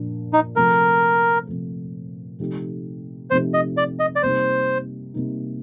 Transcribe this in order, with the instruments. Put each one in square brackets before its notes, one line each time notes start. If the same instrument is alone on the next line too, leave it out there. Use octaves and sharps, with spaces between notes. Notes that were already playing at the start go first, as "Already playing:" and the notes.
Already playing: [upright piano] A#2 F3 A#3 D4
[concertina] D#4
[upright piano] C3 F3 A3 [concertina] A#4
[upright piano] C3 F3 A3
C3 F3 A3 D#4 G4
[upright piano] C3 F3 A3 D#4 G4 [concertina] C5
[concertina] D#5
D5
D#5
D5
[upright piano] C3 G3 A#3 D#4 [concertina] C5
[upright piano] C3 G3 A#3 D#4